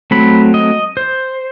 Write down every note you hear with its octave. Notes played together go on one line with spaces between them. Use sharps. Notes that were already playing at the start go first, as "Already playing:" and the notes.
F#3 A3 C4 B5
D#5
C5